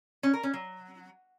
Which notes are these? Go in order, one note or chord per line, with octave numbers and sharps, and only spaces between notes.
C#4
A#4
C#4
F#3